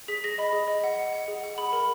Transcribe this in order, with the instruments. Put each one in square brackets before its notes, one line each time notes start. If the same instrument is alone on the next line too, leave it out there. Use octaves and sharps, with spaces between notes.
[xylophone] G#4 B6
G#4 A#6
D#5 B5
G#4
D#5
F#5
F#5
F#5
G#4
F#5
G#4 B5
A#4 B5